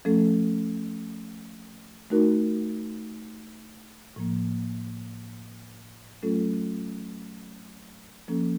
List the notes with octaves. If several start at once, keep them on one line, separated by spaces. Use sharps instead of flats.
F3 A3 C#4 A4
A3 D#4 F#4 A#4
A2 F3 A#3
F#3 A3 C#4 F4 A4
F3 A#3 C#4 A4